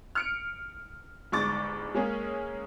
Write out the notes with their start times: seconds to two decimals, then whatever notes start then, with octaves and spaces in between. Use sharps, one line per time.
0.15 F6 C#7 D7
1.32 G1 G#2 C#6 D6 A6
1.94 G#3 A#3 C#4 G#4